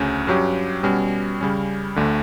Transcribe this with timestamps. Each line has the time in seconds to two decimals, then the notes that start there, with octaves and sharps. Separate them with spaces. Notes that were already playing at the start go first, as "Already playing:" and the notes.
Already playing: D2 C#3 C#4
0.27 G2 F#3 C#4 G4
0.83 B2 G3 C#4 F#4
1.41 C#3 G3 C#4
1.96 D2 D3 A3